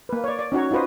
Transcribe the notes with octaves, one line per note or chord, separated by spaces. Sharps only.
A#3 B4
C#5 D5
D5
C#4 D#4 F#4 C#5
D#4 F4 F#4 B4 C5 D#5